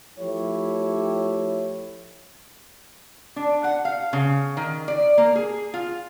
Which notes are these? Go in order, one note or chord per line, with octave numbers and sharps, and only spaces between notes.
F3 A3 E4 G4 C#5
D4
F#5
F5
C#3
D#3
D5
A#3
G#4
F4